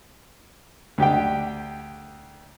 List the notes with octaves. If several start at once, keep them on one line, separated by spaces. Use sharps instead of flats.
D2 G4 G5